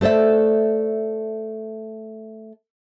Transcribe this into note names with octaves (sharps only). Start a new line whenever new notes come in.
A3 A4 C5 D5 E5